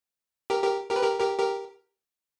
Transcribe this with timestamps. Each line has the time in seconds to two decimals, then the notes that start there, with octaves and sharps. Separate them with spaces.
0.50 G4 A#4
0.63 G4 A#4
0.90 G4 A#4
0.96 B4
1.03 G4 A#4
1.20 G4 A#4
1.38 G4 A#4